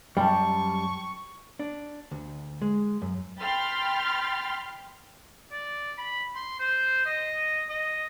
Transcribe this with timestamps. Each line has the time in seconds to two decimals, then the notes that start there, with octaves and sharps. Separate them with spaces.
0.17 F#2 G3 G5 A5 C#6
1.59 D4
2.11 D2
2.62 G#3
3.02 F#2
3.41 G5 B5 C6 F6 A6
5.51 D5
5.98 B5
6.35 C6
6.59 C5
7.06 D#5
7.69 D#5